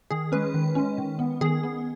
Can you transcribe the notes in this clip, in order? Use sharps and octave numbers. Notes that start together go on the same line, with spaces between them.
D#3 G#4
G#3 C#4 B4
D#3
G#3 C#4
D#3
B3
D#3 G#4
B3